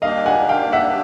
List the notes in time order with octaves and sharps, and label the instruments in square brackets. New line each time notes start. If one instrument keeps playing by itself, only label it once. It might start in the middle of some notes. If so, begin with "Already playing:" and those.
[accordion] D#3 G3 A#3 D4 G4 [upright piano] D#5 F5
[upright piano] F#5 G#5
F5 G5
E5 F#5